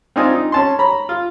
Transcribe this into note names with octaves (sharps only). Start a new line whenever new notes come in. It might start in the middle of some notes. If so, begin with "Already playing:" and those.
C4 D4 D#4 F4 G#5
D#4
C#4 A5 C6
C#5 A#5 B5
F4